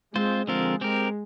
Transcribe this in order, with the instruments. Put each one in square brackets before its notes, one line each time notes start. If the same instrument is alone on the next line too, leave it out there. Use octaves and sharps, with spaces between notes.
[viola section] G#3 [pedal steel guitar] C4 F4 C5
[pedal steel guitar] D3 F3 C4 F4 A#4 [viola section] G#3
[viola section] G#3 [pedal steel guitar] C4 G4 A#4